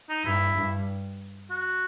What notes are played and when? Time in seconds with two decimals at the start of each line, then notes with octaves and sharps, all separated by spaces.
0.09 D#4
0.25 G2 E4
0.56 G2
1.50 F#4